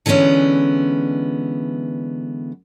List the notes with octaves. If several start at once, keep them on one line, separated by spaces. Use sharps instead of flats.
D3 E3 G#3 B3 C#4